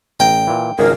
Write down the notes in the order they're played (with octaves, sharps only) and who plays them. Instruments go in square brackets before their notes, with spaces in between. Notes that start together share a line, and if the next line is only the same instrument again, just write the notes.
[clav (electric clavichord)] A1 A#5 [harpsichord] G5
[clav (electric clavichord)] A#2 E3
[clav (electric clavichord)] G#1 C#2 G#4 [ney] A#4